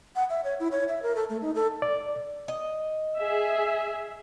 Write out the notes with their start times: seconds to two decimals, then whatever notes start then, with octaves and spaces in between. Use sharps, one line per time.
0.16 F#5
0.30 E5
0.44 C#5
0.60 E4
0.71 C#5
0.88 E5
1.03 A#4
1.15 A4
1.29 A3
1.42 D#4
1.55 A4
1.82 D5
2.48 D#5
3.18 G#4 E5